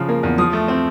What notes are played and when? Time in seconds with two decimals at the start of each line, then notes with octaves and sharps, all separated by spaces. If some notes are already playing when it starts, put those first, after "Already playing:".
Already playing: C#3 F3
0.09 A#3
0.23 E2
0.38 F3 D#6
0.53 A3
0.68 C4